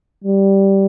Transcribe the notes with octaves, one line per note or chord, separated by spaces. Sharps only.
G3